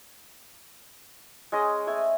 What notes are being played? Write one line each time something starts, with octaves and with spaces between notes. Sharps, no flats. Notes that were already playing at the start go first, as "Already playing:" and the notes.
G#3 C#4 D#5
A3 G#5